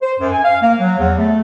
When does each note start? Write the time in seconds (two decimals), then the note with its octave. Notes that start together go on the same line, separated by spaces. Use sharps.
0.02 C5
0.19 F#2
0.32 G#5
0.44 F5
0.62 A#3
0.80 F#3
0.99 E2
1.18 A3